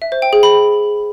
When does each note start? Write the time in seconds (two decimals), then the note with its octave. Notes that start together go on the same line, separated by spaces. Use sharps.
0.02 E5
0.12 C5
0.22 G5
0.33 G#4
0.43 B5